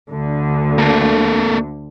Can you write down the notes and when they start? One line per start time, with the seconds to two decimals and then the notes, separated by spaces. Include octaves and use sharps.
0.11 D2 D3
0.78 A#3 A4